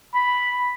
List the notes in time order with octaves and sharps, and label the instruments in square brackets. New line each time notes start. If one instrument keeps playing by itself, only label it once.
[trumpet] B5